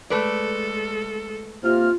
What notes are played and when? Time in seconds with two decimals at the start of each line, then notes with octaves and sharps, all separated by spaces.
0.10 G#3 A3 A4 B4 D5
1.64 C3 A#3 F4 F6